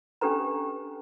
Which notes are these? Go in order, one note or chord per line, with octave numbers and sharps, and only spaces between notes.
C#4 D4 G4 A4 B4 A#5